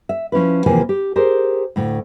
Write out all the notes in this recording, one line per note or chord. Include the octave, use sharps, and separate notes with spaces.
E5
F3 C#4 E4 B4
D#2 C3 E3 F3 A#3 G#5
G4
G4 G#4 A#4 C5
D2 A2